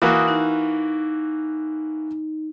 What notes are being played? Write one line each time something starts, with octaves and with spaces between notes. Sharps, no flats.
E3 A#3 F#4 D#6
D#4